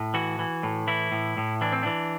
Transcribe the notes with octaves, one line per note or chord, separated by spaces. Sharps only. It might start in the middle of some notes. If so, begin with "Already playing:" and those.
Already playing: A2
E3 F#4
E3
A2
E3 E4
A2
A2
E3 D4
C4
E3 D4